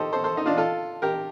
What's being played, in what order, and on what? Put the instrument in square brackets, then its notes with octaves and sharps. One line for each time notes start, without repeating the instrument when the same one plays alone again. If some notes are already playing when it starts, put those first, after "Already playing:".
Already playing: [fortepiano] D#4 G4 A4 C5
A4 C5
A4 C5
D#4
D4 F4
F4 A4
G4 A#4